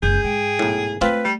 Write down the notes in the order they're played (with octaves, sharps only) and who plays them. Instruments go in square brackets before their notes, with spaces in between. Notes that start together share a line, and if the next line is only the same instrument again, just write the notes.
[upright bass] F#1 C#2 [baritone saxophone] G#4 [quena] G6
[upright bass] G#2 [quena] G5
[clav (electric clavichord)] B1 A2
[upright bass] A3 [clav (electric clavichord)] C4 F4 [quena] B4
[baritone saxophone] G3